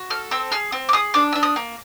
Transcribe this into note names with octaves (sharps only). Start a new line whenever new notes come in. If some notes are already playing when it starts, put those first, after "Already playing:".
Already playing: F#4
A4 F6
C4 E6
G#4 F6
C4
D6
G#4 D#6
D4 D6
D4 E6
D#6
A#3